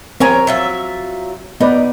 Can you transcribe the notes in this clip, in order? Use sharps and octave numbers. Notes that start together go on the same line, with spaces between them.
C4 A#4 C#5 G#5 A#5
F#3 F4 E5
B3 D#4 B4 D5